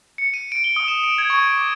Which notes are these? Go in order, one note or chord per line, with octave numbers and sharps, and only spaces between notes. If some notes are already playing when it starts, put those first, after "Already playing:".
C#7
D#7
D7
G7
D#6
E7
D7
G#6
C#6
D7
D6